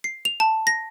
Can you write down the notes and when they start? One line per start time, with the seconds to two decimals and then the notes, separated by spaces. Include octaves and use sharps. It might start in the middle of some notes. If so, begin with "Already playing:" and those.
0.04 C7
0.25 F7
0.40 A5
0.67 A#6